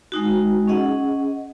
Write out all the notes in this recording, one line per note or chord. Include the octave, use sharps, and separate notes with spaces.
G#3 D#4 F#4
C#4 G#4 D#5 F#5